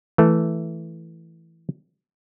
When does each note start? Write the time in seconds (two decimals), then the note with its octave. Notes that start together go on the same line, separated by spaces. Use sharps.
0.18 E3 A3